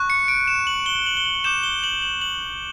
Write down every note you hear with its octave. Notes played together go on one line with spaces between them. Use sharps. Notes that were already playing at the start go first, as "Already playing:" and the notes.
Already playing: C#6 F#6
C#7
D7
E7
F#7
G7
F#7
G7
F#7
D6 G6 E7
G7
F#7
F#7
F#7